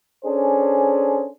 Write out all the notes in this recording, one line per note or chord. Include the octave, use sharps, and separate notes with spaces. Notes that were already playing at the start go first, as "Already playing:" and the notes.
C#4 D4 G#4 A4 C5